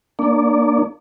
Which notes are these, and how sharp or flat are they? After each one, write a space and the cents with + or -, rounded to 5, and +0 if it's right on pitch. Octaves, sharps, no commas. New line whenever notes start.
A#3 +0 D4 +20 D5 -30